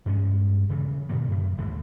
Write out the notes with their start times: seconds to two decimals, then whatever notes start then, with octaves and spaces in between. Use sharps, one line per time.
0.06 G2 G#3 A#3 C#4
0.69 D#1 C#3 E3
1.09 A#2 D3 D#3 A#3
1.30 F#2
1.58 G1 D#2 A2 G#3